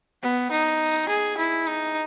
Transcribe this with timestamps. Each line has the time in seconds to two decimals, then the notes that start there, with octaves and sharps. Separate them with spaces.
0.23 B3
0.51 D#4
1.09 G#4
1.38 E4
1.67 D#4